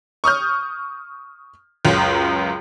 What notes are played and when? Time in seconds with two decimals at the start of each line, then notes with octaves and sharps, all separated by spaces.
0.24 C#6 D#6 F6 G6
1.85 C#2 F#2